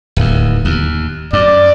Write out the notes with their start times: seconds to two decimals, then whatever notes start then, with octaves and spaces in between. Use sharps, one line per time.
0.17 D1 D#2
0.65 D#2
1.33 F#2 D5